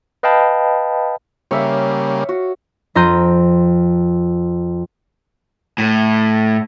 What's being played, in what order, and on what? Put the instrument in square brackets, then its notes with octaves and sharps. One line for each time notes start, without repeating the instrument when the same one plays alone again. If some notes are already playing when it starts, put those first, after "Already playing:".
[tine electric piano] B4 D#5 F5 G5 A5 B5
[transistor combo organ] C#3 G3 A#3 [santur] C#5 E5 F5
[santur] F#4
[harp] F2 F4 A#5 C6 G6 D#7
[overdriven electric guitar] A2